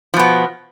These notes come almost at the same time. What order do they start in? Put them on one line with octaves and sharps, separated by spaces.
F3 B2 B3